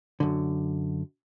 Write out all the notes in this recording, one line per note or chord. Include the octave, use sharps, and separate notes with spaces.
F#2 D3